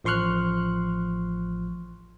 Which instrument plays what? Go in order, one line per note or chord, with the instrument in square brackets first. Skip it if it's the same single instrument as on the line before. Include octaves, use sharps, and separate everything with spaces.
[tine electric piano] A1 F3 C6 C#6 F6 F#6